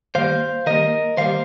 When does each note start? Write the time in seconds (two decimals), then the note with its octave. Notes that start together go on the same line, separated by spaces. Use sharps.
0.15 D#3 G3 A#3 C5 F5
0.66 D#3 G3 A#3 A#4 D#5
1.17 D#3 G3 A#3 C5 F5